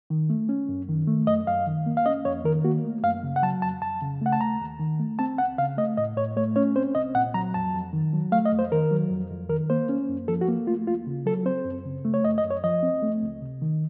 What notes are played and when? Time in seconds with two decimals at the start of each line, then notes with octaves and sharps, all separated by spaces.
0.10 D#3
0.30 A3
0.49 C#4
0.69 F#2
0.88 D#3
1.07 A3
1.27 F#2 D#5
1.47 F#2 F5
1.66 D#3
1.86 A#3
1.97 F5
2.06 C#4 D#5
2.25 F2 C#5
2.45 D#3 A#4
2.64 A#3 F#4
2.84 A3
3.03 F#2 F5
3.23 C#3
3.36 F#5
3.43 F#3 A5
3.62 F2 A5
3.82 F2 A5
4.01 C#3
4.21 A3 F#5
4.32 A5
4.41 D#2 A#5
4.61 D#2
4.79 D#3
4.99 A3
5.19 C4 A5
5.38 C#2 F#5
5.58 C#3 F5
5.77 A3 D#5
5.97 A2 D#5
6.17 A2 C#5
6.37 A3 C#5
6.56 C#4 C#5
6.76 C4 C5
6.95 C2 D#5
7.15 A#2 F#5
7.34 F#3 A#5
7.54 F2 A5
7.74 F2
7.93 D#3
8.13 F#3
8.32 A3 F5
8.45 D#5
8.52 F2
8.59 C5
8.72 D#3 A#4
8.91 F#3
9.11 F2
9.30 F2
9.49 D#3 A#4
9.70 A#3 C5
9.89 C#4
10.09 F#2
10.28 F3 A4
10.41 F#4
10.48 A#3
10.67 A3 F4
10.87 D#2 F4
11.07 C#3
11.26 F#3 A4
11.45 C4 C5
11.65 F#2
11.85 C#3
12.05 A3
12.14 C#5
12.24 F#2 D#5
12.38 D#5
12.44 F#2
12.51 C#5
12.63 F3 D#5
12.83 C4
13.02 A3
13.23 C#2
13.42 C3
13.62 D#3